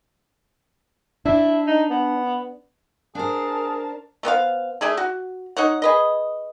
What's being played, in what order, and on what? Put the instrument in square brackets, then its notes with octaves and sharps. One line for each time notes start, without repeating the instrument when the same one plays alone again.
[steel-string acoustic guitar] D4 [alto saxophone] E4
[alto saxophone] D#4
B3
[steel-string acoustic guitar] D4 C5 [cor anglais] G#4 [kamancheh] A#4 A5
[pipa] A3 B3 C5 F5
A3 G#4 D5 E5
F#4
D#4 C#5 F#5
G#4 B4 D#5